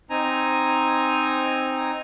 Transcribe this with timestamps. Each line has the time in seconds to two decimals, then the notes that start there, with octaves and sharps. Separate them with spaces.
0.10 C4 D#4 G#5 A#5